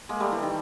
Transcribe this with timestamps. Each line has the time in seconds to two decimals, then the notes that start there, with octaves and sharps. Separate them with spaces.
0.09 G#3 A#3
0.20 G3 A3
0.32 E3
0.42 D#3